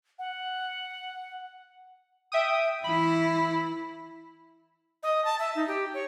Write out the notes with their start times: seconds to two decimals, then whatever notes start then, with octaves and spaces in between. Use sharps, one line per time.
0.19 F#5
2.32 E5 G5 D#6
2.84 E3 E4 B5
5.03 D#5
5.25 A5
5.39 E5
5.55 D#4
5.68 G4
5.94 C#5